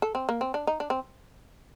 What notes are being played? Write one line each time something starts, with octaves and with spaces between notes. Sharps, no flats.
A4
C4
A#3
C4
D4
D#4
D4
C4